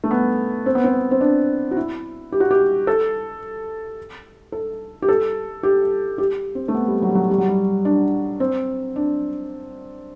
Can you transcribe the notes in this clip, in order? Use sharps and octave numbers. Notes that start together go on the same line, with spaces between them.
A3
B3
C4
B3
C4
C4
D4
F#4
E4
G4
F#4
G4
A4
A4
G4
A4
G4
G4
C4
A3
B3
G3
F#3
G3
F#3
G3
F#3
G3
D4
C4
D4